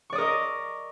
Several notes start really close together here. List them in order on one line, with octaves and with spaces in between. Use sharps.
C#6 D5 D#6 A#4 D#5